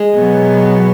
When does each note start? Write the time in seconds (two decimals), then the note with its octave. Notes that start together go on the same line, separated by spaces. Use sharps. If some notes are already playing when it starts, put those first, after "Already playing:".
Already playing: G#3
0.15 B2 F#3 B3